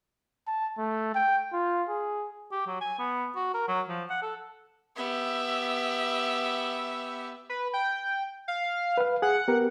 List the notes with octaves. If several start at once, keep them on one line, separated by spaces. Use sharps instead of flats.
A5
A3
G5
F4
G#4
G4
F#3
G#5
B3
F#4
A#4
F#3
F3
F#5
A4
B3 G4 E5
B4
G5
F5
B4 F5
G#4 F#5
B3 G4 A#4